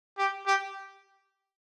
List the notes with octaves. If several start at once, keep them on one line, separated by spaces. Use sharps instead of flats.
G4
G4